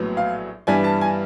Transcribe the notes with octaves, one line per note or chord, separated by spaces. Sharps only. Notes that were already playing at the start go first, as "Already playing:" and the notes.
Already playing: A#1 A2 F#3 B3
F5
G2 E3 G3 B3 G#5
A5
G#5